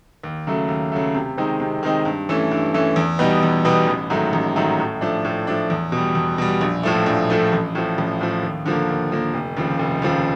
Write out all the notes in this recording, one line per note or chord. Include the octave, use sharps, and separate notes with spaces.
D#2
C#3 F#3 A3
D#2
C#3 F#3 A3
C3
D#3 G#3 C4 D#4
C3
D#3 G#3 C4 D#4
G2
E3 A3 C#4
G2
E3 A3 C#4
E2
B2 G3 B3 D#4
E2
B2 G3 B3 D#4
A1
G#2 D#3 F#3 A3
A1
G#2 D#3 F#3 A3
A2
F3 A3 D4
A2
F3 A3 D4
E2
B2 G3
E2
B2 G3
A#1
A2 F3 A3
A#1
A2 F3 A3
A1
A2 F3
A1
A2 F3
D#2
D3 F3 A#3
D#2
D3 F3 A#3
F1
D#2 C#3 F3
F1
D#2 C#3 F3